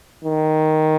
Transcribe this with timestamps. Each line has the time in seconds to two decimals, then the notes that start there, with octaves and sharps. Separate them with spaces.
0.24 D#3